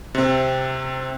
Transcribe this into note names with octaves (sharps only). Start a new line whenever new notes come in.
C3 C4